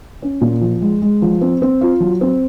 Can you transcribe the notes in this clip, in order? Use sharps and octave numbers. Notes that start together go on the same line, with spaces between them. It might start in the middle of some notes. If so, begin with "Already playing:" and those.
C#4
A#2
F3
G#3
G#3
F3
C4
C4
F4
F#3
C4